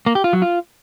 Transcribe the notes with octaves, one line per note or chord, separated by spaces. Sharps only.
A#3
G4
F4
F#3
F4